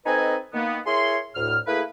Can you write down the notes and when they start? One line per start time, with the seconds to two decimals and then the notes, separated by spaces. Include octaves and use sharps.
0.06 C4 D#4 A4 B4 D#5 G#5
0.54 D#3 A#3 B3
0.86 E4 G#4 A#4 C#5 C6
1.36 D2 A2 F6
1.67 A3 A#3 E4 G#4 B4